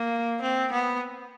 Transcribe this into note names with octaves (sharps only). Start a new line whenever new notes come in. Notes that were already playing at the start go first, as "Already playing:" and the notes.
Already playing: A#3
C4
B3